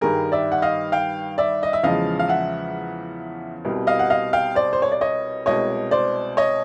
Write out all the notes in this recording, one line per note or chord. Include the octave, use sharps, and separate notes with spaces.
G2 D#3 G3 G#4 A#4
D5 E5
F#5
D#5 F5
F5 G5
D5 E5
D#5
E5
E2 C#3 F3 G#3 D#5 F5
F5
E5 F#5
C2 B2 G3
D#5 F5
F#5
D#5 F5
F5 G5
C5 D5
C5
C#5
D5
C#5 D#5
C2 B2 G#3 C#5 D#5
C5 D5
C#5 D#5